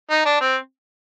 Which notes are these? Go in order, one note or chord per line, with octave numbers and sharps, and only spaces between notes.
D#4
D4
C4